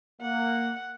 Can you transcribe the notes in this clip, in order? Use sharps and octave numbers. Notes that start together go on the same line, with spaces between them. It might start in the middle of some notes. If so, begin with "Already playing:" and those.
A#3 F#5